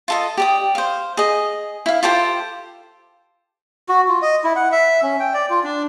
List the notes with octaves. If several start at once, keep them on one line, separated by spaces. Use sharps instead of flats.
F4 A4 D#5
G4 D5 D#6
C5 F5
G#4 D#5
E4 F5
F4 G4 A4 C5
F#4
F4
D#5
E4
F#5
E5
C#4
G5
D5
F4
D4